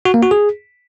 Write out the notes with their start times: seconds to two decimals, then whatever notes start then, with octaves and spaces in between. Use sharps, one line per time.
0.05 F#4
0.14 A#3
0.23 F#4
0.31 G#4